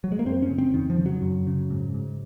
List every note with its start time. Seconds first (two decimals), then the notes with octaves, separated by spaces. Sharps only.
0.04 F#3
0.12 G#3
0.19 A#3
0.26 F#2 C4
0.42 C#4
0.50 C#3
0.58 C4
0.74 F2 D#3
0.90 F3
0.99 C#3
1.06 F#3
1.22 F#2
1.47 C#3
1.70 G#2
1.94 G#2